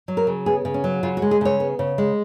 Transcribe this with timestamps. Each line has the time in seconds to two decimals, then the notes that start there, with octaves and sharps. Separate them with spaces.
0.08 F#3
0.17 A#4
0.27 C#3
0.46 B3 G#4
0.65 C#3
0.74 C#4
0.84 F#3
1.03 C#3 F4
1.17 F#4
1.22 G#3
1.31 G#4
1.41 C#3 C#5
1.60 B3
1.79 C#3
1.98 G#3